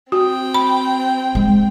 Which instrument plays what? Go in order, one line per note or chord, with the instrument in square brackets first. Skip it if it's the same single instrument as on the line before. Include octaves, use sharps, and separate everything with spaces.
[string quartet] C4 G5 [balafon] F#4
[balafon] B5
[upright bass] G#3